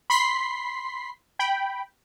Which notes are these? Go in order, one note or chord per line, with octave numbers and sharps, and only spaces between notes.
B5 C6 B6 C7
G5 B5